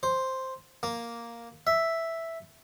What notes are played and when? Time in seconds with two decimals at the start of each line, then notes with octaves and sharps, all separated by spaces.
0.03 C5
0.83 A#3
1.67 E5